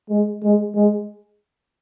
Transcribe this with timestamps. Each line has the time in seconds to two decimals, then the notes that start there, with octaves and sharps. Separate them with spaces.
0.10 G#3
0.43 G#3
0.75 G#3